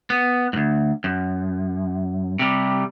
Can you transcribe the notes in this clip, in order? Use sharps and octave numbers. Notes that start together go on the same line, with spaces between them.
B3
D2 G#2
F#2
C3 G3